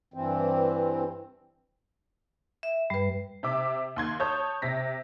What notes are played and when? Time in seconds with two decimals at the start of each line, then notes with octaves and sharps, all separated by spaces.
0.14 G2 E3 C4
2.63 E5
2.90 G2 G3 B4
3.43 C3 E5 D6
3.96 D#2 C6 G#6
4.20 C#5 A5 D#6 G6
4.62 C3 A#6 B6